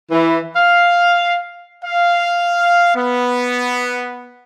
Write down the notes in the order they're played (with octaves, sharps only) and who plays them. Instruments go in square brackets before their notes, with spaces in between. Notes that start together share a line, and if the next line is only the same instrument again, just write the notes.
[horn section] E3
F5
[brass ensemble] F5
B3